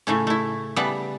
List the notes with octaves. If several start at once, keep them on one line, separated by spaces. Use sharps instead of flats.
A2 C#3 A3 C#4
A3 E4
C#3 G3 B3 E5 F#5 A5